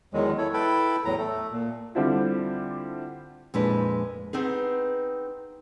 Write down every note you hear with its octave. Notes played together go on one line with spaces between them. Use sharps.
E2 D#3 F#3 G#3
E4 A4 C#5
E4 A4 B4 G5 A5 B5
E2 A2 F#3 A#5
A3 A4
A#2
D3 G3 C4 D4 E4 F4
F2 A#2 G#3 D4 E4 B4
B3 C4 D#4 G#4